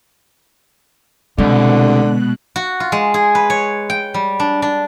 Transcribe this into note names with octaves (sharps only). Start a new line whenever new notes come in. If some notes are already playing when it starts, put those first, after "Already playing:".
C2 B2 D3 G#3 F#6
F#4
F4
G#3
G#4
B4
C#5
G5
G3
D4
D4